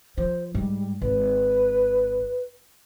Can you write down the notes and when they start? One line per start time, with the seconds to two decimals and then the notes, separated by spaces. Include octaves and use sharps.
0.18 F3 C5
0.55 G#2 G3
1.01 G#1 B4